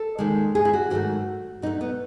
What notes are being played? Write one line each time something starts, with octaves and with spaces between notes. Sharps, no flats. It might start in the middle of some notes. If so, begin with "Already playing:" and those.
Already playing: A4
D#2 D#3 G#3
G#4
E4
F#4
G#2 D#3 F#3 A3 F#4
B2 F#3 A3 D#4
B3